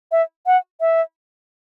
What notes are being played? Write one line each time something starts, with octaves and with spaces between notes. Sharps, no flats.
E5
F#5
E5